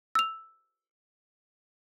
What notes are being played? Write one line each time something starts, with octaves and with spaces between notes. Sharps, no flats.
E6 F7